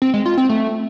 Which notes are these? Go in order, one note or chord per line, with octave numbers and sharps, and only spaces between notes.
C4
G#3
F4
C4
A3